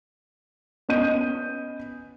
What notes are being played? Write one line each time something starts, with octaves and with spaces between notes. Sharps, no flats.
B3 C#4 D#5 G6 D#7